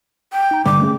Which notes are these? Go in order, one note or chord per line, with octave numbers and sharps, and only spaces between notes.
G5
D#4 A#5
C2 G2 D3 D6
A3 C#4 G#4